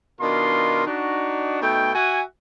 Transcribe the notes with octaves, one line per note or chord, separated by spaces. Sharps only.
B2 D#3 D4 F4 A#4 C6
D4 D#4 F#4
B2 A3 D#4 G5
F#4 E5 F#5 G#5